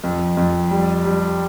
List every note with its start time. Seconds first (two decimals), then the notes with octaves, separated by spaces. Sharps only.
0.04 F2
0.37 F2
0.71 G3
1.05 G3